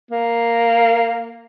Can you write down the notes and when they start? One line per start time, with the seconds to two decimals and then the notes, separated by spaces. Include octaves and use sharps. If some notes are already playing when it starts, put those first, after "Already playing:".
0.11 A#3